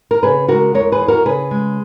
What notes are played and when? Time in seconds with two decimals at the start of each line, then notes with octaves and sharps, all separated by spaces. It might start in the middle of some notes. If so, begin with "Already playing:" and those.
0.11 A#4
0.23 C#3 G#4 B4
0.48 G#3 F#4 A#4
0.74 E2 A#4 C#5
0.92 G#4 B4
1.01 E2
1.08 F#4 A#4
1.26 C#3 G#4 B4
1.51 G#3